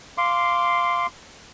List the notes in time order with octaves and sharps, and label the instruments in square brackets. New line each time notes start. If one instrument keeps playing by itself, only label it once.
[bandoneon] F5 C6 D6